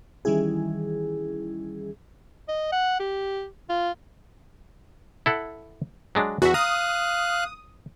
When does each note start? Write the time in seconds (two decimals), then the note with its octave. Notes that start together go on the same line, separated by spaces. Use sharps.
0.25 D#3 E3 G3 C#4 E4 G#4
2.48 D#5
2.72 F#5
3.00 G4
3.69 F4
5.26 E4 A4 F#5
6.15 F#3 G#3 D4
6.42 E2 F#4 E5
6.54 F5 A#5 D#6 F#6